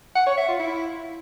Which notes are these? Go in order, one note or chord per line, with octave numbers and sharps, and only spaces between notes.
F#5
C#5
E5
F4
E4